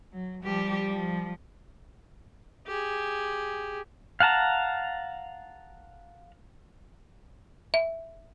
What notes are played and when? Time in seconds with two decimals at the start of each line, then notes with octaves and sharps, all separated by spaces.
0.13 F#3
0.44 F3 G3 G4
0.90 F3
2.67 G4 G#4
4.20 F5 F#5 A5 A#5
7.74 E5